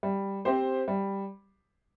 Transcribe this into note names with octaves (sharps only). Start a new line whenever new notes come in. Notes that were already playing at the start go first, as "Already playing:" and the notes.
G3
C4 G4 C5
G3